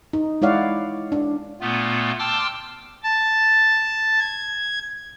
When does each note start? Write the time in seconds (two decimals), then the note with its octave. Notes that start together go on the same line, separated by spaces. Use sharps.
0.13 D#4
0.42 G#3 E4 C#5 D5 F5 F#5
1.12 D4
1.61 A#2 A3 B3 F4
2.19 G5 A5 C6 D6 E6 F6
3.03 A5
4.20 G#6